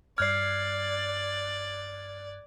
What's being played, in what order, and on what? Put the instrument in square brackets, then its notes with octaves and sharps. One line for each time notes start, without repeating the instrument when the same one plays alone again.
[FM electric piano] G2 F#6 G#6 [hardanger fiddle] D5 [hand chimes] F6 C7